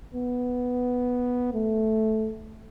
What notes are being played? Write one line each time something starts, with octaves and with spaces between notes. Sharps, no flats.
B3
A3